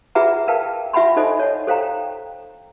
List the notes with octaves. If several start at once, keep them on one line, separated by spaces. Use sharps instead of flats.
F4 G#4 B4 E5 F#5 A#5
A#4 B4 F5 G5 A5
F4 E5 F#5 G#5 B5 C6
D#4 A4 C5 D#5 G#5
C#5 F#5
A4 C5 F5 G5 A#5